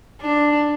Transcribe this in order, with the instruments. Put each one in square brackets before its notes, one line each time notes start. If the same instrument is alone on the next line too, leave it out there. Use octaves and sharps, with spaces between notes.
[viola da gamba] D4